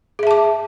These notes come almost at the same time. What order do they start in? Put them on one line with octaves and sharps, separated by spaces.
G#4 E5 A5 D6